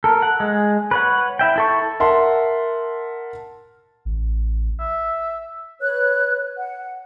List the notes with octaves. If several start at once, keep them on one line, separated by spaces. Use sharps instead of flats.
A4 A#4
F#5
G#3
B4 C#5 F#5
E4 E5 G5
E4 A4 C#6
A#4 E5 F#5 A5 C6
A1
E5
B4 C#5 F#6
F#5